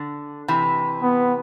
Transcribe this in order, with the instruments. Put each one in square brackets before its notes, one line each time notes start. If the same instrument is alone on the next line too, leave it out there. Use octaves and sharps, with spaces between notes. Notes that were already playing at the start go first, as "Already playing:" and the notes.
Already playing: [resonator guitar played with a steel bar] D3
C3 E3
[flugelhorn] B3